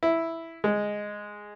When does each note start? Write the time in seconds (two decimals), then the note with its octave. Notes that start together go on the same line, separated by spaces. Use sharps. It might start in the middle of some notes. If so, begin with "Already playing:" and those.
0.03 E4
0.64 G#3